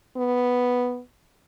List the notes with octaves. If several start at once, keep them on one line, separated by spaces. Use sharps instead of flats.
B3